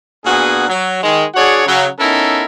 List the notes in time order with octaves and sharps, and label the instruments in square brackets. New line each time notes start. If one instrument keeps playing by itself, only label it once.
[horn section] A#2 B3 D4 F#4 G#4
F#3
D#3 G#3
D4 F#4 G#4 C#5 D5 F#5
C#3 F#3
B3 C#4 D#4 E4 A4 A#4